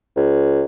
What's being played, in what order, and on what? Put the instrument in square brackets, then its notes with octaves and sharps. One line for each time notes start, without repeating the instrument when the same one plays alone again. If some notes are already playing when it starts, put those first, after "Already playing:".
[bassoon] C#2